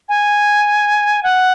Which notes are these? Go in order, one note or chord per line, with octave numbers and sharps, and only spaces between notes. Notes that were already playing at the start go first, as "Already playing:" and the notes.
G#5
F#5